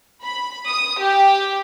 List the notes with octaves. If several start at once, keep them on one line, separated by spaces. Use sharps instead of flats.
B5
D#6
G4